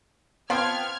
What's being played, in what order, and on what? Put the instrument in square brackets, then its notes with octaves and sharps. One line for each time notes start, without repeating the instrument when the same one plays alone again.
[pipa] F3 C4 F4 [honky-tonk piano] B3 G5 [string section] F6 G#6